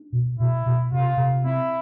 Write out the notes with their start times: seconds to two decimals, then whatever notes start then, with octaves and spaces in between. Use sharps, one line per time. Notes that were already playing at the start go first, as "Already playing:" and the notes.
Already playing: D4
0.12 B2
0.39 B2 E4
0.66 B2
0.92 C3 F4
1.17 C3
1.44 C4 E4